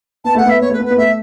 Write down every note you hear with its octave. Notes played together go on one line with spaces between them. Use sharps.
B3 A5
A3 F#5
B3 E5
B3 C#5
A3 B4
B3
B4
B3
A3 E5